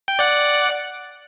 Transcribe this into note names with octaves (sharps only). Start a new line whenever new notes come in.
G5
D5 F#5